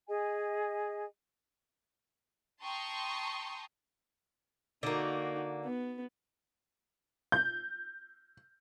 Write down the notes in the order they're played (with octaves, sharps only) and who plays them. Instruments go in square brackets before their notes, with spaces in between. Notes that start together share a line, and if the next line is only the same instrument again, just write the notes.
[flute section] G#4 D#5 G#5
[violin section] G5 A5 A#5 C6 C#6 D#6
[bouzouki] D3 A#3 [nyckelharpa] D#4 F#4
[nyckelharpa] B3
[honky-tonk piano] G6